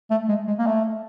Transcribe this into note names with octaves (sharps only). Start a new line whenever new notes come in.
A3
G#3
G#3
A#3
A3